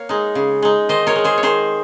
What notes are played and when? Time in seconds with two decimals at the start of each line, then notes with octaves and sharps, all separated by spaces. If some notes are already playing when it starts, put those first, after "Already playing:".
Already playing: A#3 C#5 F5
0.09 G#3 D#4
0.35 C#3
0.62 G#3 D#4
0.89 D#3 C5 D#5
1.07 A#4 C#5
1.16 G#3 D#4
1.24 G#4 C5
1.38 C#5
1.43 D#3 G#4 C5